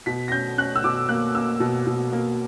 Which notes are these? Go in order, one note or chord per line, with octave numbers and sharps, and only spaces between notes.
B2 B6
A#6
C#4 G6
C#4 F#6
E6
B2 D6
A#3 F#6
A#3 E6
B2
B2
A#3